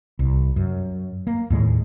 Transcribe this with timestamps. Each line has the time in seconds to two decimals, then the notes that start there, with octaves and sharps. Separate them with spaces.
0.19 C2
0.56 F#2
1.27 A#3
1.50 D#2 A2 G#3